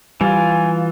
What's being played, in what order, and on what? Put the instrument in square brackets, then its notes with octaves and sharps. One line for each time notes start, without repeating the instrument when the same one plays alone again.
[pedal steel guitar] E3 F4 [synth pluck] G3 [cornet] G#5